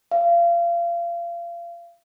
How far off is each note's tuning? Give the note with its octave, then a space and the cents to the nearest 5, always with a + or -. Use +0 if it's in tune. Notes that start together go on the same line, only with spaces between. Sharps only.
F5 -30